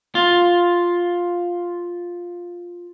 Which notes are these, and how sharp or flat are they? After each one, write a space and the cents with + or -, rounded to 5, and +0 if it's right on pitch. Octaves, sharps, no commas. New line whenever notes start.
F4 +5